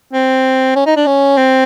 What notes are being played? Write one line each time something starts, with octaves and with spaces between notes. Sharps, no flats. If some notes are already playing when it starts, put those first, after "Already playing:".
C4
C#4
D#4
D4
C#4
C4